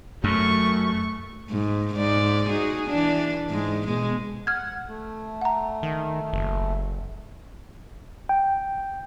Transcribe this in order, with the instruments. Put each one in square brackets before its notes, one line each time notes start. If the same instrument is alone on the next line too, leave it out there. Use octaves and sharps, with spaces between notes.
[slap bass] F#2 [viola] A3 C#6
[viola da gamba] G#2
G#2 D5
D#4 F#4 G#4
E3 D4
G#2 G#3
B2 G#3
[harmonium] F#5 [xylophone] F6 G#6
[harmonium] A3
[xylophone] F#5 A#5
[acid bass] D#3
F#1
[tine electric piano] G5